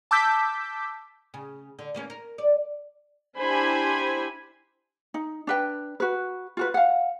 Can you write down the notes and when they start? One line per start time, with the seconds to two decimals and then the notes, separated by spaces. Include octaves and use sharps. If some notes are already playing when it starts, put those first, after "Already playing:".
0.11 A5 D6 E6 G6 B6
1.34 C#3
1.79 D3
1.95 E3 A#3 C#4
2.10 A#4
2.38 D5
3.38 D4 E4 G4 C5 G#5 B5
5.14 D#4
5.47 D4 B4 G5
6.00 F#4 B4
6.57 F4 F#4 B4
6.74 F5 F#5